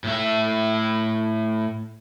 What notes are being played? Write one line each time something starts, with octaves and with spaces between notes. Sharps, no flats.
A2 E5